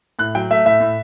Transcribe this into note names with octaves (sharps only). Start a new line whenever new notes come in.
A2 F#6
F#3 G5
A3 E5
A2 E5
A2